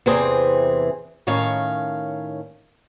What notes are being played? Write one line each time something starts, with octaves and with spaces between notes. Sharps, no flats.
E2 C3 E3 C4 G#4
A2 D#3 C#4 C#5 F5